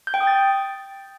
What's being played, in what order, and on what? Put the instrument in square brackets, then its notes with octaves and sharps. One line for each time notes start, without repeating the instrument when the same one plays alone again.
[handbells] G6
G5
D#6
A6